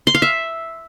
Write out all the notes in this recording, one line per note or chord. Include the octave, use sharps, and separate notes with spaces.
C6
F5
E5